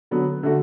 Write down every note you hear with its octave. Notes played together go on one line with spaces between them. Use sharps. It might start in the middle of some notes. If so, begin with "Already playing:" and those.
D3 F#3 B3
D3 A3 F#4